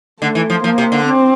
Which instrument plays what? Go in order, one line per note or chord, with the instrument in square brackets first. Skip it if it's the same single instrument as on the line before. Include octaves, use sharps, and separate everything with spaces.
[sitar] D3 [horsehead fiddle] A3
[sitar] E3
F3
[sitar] F3 [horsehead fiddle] A#3
[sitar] C3
D3
[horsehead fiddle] C4